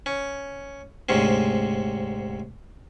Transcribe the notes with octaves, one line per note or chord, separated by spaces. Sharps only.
C#4
D2 G#2 C3 C#4